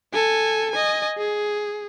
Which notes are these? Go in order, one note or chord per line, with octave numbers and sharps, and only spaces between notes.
A4 G#5
D#5 G#5
G#4